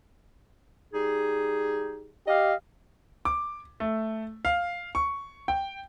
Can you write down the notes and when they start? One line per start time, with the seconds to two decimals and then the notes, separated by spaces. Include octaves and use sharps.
0.94 G3 D#4 G#4
2.27 G4 D#5 F5
3.25 D6
3.80 A3
4.45 F5
4.95 C#6
5.48 G5